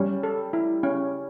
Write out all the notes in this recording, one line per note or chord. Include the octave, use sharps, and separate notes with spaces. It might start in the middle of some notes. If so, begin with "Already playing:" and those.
Already playing: G3 C#4
A4
E4
C#4